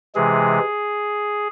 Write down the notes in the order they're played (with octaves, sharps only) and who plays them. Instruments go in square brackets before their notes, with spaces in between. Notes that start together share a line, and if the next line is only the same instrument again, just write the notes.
[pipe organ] C3 E3 G#3 G#4